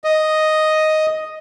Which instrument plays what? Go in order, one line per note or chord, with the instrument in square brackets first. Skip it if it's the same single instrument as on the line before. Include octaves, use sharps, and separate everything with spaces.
[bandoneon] D#5